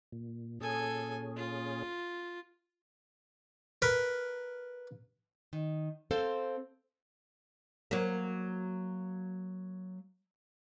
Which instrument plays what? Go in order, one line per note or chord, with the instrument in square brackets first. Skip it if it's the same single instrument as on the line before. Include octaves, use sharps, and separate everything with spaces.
[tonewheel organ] A#2
[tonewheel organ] A#2 C#4 G#4 [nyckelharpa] A4 G#5
[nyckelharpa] F4
[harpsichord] A#4 B4
[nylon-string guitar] D#3
C4 A4 C5 F5
[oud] F#3 A#3